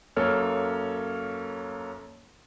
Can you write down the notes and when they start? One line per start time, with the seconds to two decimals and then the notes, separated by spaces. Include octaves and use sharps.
0.16 F#2 A#3 A4 C#5 F6